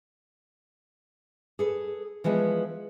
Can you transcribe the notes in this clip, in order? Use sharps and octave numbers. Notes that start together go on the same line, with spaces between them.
G#4 A4 B4
E3 F3 G#3 B3